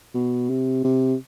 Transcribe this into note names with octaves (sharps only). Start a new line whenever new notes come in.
B2
C3
C3